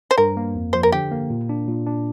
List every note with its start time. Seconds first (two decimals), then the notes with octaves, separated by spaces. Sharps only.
0.11 C5
0.18 G2 A#4
0.37 A#3
0.55 F2
0.73 F3 C5
0.83 A#4
0.92 D3 G4
1.12 A#3
1.30 A#2
1.49 D4
1.68 A#2
1.86 D4